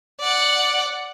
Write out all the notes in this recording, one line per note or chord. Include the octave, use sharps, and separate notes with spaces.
D5 F#5